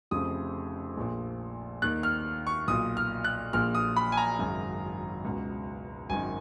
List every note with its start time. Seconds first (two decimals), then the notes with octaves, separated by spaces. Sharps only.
0.11 F1 F2 C#3 D#6
0.97 A#1 A#2
1.82 D#2 D#3 F#6
2.03 F6
2.47 C#6
2.68 B1 A#2 D#6
2.97 F6
3.24 F#6
3.53 A#1 A#2 F6
3.75 D#6
3.96 B5
4.12 G#5
4.17 A#5
4.39 G#1 F#2 C#3
5.25 C#2 B2
6.10 G#1 F#2 D#3 G#5